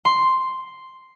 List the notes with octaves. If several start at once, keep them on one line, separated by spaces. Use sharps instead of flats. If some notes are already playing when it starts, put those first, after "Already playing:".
C6